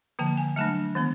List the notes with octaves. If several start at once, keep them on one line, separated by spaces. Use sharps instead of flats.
D3 F3 A#3 A5
G#5
F#3 A3 D4 A5
D#3 G#3 B3